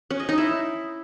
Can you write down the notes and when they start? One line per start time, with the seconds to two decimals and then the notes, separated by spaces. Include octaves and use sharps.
0.10 C#4
0.20 D#5
0.29 D#4
0.38 E4